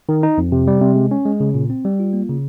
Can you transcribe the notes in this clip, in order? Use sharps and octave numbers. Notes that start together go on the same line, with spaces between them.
D#3
D#4
F2
C3
G3
C3
G#3
C#4
G#3
C#3
A#2
C4
G3
F4
A#3
C#3